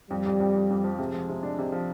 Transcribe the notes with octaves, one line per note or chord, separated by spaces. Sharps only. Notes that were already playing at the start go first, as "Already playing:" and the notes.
F2 G3
F2
F2
F2
F2
F3
C3 G#3
F3
C3
D4
C3
F3